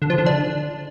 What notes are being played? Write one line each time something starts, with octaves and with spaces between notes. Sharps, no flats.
D3
F3
D3
D4